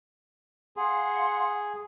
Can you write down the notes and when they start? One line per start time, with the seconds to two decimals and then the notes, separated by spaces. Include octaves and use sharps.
0.77 G#4 F5 F#5 C6